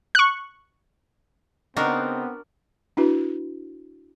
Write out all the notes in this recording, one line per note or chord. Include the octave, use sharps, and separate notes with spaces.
C#6 F#6
C#3 B3 C4 D4 D#4 F#4 A#4
D4 E4 F#4 B4